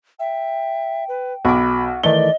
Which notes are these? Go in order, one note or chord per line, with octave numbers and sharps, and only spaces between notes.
E5 G5
B4
B1 F#4 B5 D6
D#3 E3 A3 D5 D#5 G7